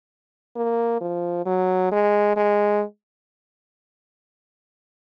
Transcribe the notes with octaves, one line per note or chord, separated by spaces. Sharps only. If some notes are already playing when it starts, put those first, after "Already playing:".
A#3
F3
F#3
G#3
G#3